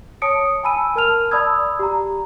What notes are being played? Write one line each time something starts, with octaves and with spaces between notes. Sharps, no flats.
C#5 A5 D#6 C#7 D7
G#5 A5 B5 E6 D#7
A#4 A5 F6 F7
D5 A5 B5 D#6 E6 G#6
G4 A#5